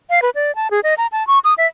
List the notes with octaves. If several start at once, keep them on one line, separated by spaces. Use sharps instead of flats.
F5
B4
D5
A5
G#4
D#5
A#5
A5
C#6
D#6
E5